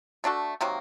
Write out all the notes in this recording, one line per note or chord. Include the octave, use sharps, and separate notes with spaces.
A3 D4 F#4 A4
C3 D#3 F#3 A#3